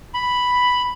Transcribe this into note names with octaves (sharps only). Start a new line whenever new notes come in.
B5